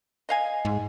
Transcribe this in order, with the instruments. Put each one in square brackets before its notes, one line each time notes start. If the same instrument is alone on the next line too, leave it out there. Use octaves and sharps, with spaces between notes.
[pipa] D#5 F5 G#5
[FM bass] G#2